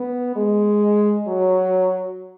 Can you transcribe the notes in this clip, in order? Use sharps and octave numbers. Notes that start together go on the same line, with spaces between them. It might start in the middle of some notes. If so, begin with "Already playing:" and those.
Already playing: B3
G#3
F#3